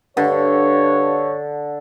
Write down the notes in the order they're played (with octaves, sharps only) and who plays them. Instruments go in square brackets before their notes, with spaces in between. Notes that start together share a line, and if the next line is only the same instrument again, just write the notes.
[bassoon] G2 [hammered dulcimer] D3 [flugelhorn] C#5